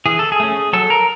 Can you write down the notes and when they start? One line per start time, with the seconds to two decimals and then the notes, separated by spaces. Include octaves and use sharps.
0.06 E3 G#4
0.19 A4
0.32 G#4
0.40 A3 C#4
0.73 F#3 A4
0.90 A#4